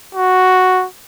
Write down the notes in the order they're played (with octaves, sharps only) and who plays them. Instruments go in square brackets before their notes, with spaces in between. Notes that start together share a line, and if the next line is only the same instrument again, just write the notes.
[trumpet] F#4